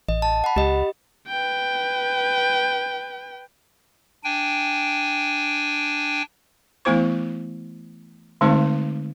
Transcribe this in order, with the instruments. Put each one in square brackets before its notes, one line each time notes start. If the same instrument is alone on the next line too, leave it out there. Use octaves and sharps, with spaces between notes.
[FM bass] A1 [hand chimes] D#5
[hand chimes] A5
F#5 B5
[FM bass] C#2 [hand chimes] G4 D#5
[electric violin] B4 G5
[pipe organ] D4 G5 G#5
[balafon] E3 A3 B3 E4 C5 C#6
D3 G#3 A3 C4 D#4 C5